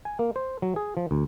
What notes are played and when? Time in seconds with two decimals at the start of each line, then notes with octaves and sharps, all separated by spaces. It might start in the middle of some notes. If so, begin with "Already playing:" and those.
0.05 G#5
0.19 A#3
0.36 C5
0.62 F#3
0.76 G#4
0.97 F3
1.11 D2